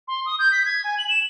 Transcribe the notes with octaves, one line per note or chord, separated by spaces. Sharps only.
C6
D#6
G6
B6
G#6
G#5
F#7
E7